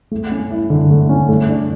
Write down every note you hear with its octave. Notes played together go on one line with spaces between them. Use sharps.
A3
C#4
E4
D3
A3
C#4
A3
D4